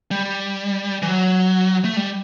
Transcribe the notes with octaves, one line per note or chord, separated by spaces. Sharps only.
G3
E3
F#3
A3
G3